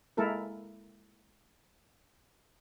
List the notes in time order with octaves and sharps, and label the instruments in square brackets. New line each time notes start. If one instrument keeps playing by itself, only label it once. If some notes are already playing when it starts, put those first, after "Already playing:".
[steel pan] G#3 A#3 E4 A4 A#4